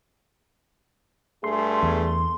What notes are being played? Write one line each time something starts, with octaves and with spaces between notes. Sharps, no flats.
G2 A3 G#4 C6
E2